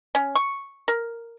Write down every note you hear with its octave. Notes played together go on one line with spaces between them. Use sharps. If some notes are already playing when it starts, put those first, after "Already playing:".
C#4
C#6
A#4